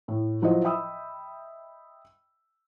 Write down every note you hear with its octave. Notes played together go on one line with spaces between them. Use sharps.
A2
F3 F#3 E4 C5 D#5
D#5 E5 G5 B5 D#6 E6